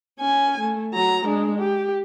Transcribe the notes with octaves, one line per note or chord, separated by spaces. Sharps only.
C#4 G#5
A3
F#3 A#5
G#3 D4
G4